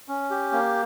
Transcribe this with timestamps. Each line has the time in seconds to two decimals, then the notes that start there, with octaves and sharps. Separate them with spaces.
0.08 C#4
0.30 G4
0.52 A#3